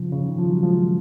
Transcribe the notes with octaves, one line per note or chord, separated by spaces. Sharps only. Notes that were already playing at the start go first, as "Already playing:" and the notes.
Already playing: C#3 F3
C#3
D#3
F3
F#3
F3 G#3